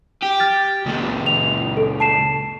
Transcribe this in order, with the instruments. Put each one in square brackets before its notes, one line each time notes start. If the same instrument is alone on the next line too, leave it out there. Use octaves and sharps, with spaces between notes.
[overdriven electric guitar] G4
[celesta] F6 A6
[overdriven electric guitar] C#2 A#2
[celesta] F7
A4
A5 C7 E7